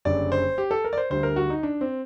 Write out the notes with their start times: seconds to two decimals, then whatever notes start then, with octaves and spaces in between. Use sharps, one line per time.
0.05 F#1 F#2 D3 G3 D5
0.32 C5
0.58 G4
0.71 A4
0.84 A#4
0.93 D5
0.98 C5
1.10 D2 D3 G3 C5
1.23 A#4
1.36 F#4
1.50 D#4
1.63 D4
1.81 C4